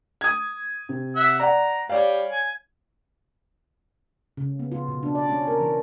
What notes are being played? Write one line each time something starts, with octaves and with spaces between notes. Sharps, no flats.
D#6 G#6
C3
E5 F#5
D5 F#5 A#5
G3 C#5 D5 F5
G#5
C#3
B3
F4
B2
D4
D5
C#4
A#4
E3